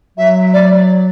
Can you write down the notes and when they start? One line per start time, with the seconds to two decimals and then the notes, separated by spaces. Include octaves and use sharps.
0.17 F#3 E5
0.53 D5